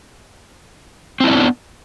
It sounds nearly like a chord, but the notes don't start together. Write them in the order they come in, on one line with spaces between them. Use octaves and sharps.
C4 E4 D#5 D4 B3